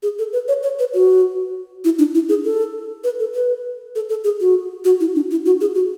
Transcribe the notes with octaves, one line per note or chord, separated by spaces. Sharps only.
G#4
A4
B4
C#5
C#5
B4
F#4
E4
D4
E4
G#4
A4
B4
A4
B4
A4
A4
G#4
F#4
F#4
E4
D4
E4
F#4
G#4
F#4